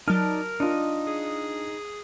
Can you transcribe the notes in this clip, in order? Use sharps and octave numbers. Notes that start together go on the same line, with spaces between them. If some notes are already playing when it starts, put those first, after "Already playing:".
F#3 D#4 A#4 D5 A5 F6
D4 D#4 F4 D#5
G#4